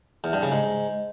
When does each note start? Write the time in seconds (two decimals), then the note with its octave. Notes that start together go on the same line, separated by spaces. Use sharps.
0.24 E2
0.33 G2
0.42 C#3
0.52 G#2